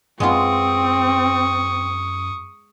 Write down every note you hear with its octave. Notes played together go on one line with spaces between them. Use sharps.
F#2 G#3 B3 C4 F4 C#6 D#6